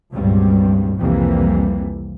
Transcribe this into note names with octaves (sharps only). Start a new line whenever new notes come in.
C#2 G2 A#2 F#3 G3 C4
C2 F2 C3 E3 G3 A#3